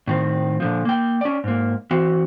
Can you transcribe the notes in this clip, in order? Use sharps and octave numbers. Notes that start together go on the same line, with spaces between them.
A2 D#3 C4
A#2 D3 F3
A#3 G5
C#4 D5
G#2 A#3
E3 C4 F#4